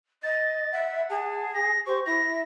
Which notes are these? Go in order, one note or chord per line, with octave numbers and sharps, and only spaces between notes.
D#5 A6
E5 F#5
G#4 A5
A#6
G4 C5 C#6
E4 E5 A#6